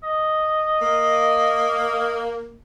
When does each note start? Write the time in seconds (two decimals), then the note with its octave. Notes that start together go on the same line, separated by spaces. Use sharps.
0.03 D#5
0.81 A#3